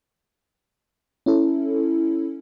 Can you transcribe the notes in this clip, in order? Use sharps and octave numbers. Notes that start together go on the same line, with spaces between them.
C#4 E4 A4